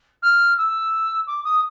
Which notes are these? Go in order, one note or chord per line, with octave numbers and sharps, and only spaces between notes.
F6
E6
D6
D#6